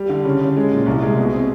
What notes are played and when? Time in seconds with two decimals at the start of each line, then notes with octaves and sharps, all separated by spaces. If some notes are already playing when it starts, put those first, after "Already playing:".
Already playing: G3
0.09 D3
0.25 C#3
0.40 C#3
0.56 G#3
0.72 A#2
0.86 C2
1.02 G#3
1.18 B2
1.32 C4